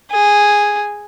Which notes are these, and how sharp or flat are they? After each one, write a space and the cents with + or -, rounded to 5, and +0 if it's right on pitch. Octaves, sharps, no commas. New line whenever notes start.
G#4 -5